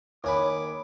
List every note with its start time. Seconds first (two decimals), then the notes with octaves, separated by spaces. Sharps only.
0.24 D#2 G#4 B4 C#5 B5 D6